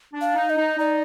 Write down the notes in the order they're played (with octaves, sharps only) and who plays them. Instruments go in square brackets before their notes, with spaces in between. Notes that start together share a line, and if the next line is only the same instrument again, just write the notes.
[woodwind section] D4
[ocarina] F5
[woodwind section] D#4
[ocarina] D#5
[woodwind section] D#4
[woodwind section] D#4 [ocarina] D5